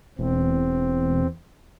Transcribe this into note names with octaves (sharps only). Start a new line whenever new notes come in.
E1 E2 C4